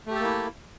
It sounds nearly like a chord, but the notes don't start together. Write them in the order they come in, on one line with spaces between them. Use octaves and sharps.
A3 G4 A4 A#3 E4